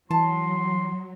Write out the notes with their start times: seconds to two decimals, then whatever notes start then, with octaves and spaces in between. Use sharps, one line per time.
0.11 E3 F#3 A5 C6